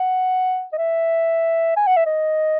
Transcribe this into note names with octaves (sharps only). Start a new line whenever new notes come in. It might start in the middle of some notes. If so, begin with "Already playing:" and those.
Already playing: F#5
D#5
E5
G#5
F#5
E5
D#5